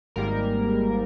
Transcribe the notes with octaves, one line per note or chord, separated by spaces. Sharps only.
G#1 G#2 G3 A#3 A#4